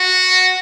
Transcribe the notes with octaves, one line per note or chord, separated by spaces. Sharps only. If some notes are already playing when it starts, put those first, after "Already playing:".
Already playing: F#4